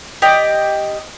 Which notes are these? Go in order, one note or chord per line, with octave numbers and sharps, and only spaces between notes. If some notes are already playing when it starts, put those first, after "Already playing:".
G4 D5 D#5